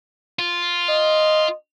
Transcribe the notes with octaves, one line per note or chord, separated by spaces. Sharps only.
F4
D#5